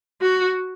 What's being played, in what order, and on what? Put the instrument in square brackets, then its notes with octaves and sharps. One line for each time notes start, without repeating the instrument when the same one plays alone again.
[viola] F#4